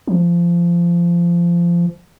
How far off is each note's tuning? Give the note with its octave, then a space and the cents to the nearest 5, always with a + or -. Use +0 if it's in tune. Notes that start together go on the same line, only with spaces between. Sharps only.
F3 -20